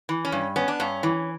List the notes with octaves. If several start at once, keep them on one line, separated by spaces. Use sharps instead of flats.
E3
C#4
G2
B3 C#4
D4
G2 C#4
E3